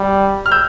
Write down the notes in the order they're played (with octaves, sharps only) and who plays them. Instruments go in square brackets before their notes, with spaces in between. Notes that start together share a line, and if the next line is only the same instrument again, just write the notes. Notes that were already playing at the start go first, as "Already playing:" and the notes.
Already playing: [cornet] G3
[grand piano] F6
E6 G6